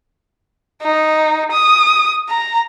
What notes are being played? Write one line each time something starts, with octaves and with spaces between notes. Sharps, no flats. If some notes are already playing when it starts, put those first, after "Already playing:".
D#4
D#6
A#5